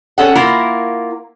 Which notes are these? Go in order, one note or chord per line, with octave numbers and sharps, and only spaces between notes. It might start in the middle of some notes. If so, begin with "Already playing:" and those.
C#4 A4 F#5
A#3 E4 F4 A#4